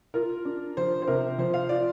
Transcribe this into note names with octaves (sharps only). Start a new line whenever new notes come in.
F4 A#4
D4
F3 C5
C5
C3 A#4
F3 C5
F5
F4 D5